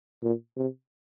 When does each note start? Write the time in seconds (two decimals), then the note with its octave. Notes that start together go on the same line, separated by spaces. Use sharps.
0.23 A#2
0.57 C3